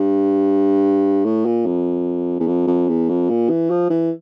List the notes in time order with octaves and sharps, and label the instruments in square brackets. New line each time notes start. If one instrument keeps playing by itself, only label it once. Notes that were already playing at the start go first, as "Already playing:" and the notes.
Already playing: [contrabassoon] G2
A2
A#2
F2
E2
F2
F2
E2
F2
A#2
E3
F3
E3